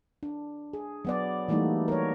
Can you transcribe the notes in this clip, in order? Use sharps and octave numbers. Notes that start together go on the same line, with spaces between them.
D4
G#4
F#3 B3 D5
E3 G3 A3 A#3 D#4 F#4
A#4 C#5